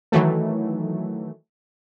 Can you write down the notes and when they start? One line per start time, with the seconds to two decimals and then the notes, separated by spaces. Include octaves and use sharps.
0.12 D#3 E3 F#3 A3